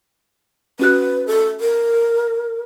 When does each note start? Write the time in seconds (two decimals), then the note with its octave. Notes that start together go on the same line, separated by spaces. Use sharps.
0.79 C#4 F#4 B4 F#6
1.27 A4
1.60 A#4